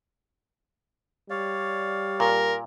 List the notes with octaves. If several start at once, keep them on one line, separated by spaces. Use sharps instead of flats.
G3 C#5 D5 F5
A#2 A#4